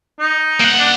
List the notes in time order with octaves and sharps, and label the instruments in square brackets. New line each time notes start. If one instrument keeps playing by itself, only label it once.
[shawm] D#4
[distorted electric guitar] A#3 F#5
[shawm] D4